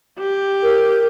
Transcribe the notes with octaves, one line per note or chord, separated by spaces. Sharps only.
G4
A#4